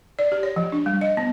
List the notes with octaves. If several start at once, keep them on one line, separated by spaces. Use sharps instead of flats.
D5
G4
C#5
F3
D4
G3
D#5
B3